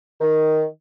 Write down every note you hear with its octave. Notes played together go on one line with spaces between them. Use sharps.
D#3